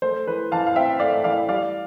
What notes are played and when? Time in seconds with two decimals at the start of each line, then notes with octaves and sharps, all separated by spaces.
0.02 A3 C5
0.27 E3 B4
0.52 E3 F5 A5
0.67 F5
0.76 C4 E5 G5
1.00 A3 D5 F5
1.24 E3 D5 F5
1.48 G3 D5 F5